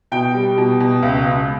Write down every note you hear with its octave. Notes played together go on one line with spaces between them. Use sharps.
B2 G5
G3
B2
B2
C#2
C#2